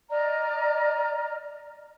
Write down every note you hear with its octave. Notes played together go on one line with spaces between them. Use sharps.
D5 D#5 A#5 F6